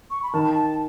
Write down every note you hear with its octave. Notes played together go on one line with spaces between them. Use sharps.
C#6
B5
D#3 A5
A5